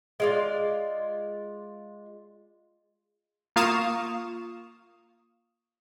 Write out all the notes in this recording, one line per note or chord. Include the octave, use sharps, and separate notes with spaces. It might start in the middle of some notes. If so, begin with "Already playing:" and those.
G#3 F4 D5
A#3 F4 F5 C#6 D#6 E7